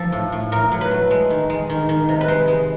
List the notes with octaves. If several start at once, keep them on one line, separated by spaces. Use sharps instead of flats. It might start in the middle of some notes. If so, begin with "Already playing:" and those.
Already playing: F3 A4
A2
A2
A2 A#4
F#3
B4
A3
G#3
D#3
G#3
D#3
D#3
C3
B4
G#3 C5
G#3